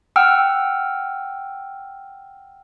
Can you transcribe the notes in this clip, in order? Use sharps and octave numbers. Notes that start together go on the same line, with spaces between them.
F#5 G5 E6 F6